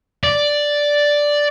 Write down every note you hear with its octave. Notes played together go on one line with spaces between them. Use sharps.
D5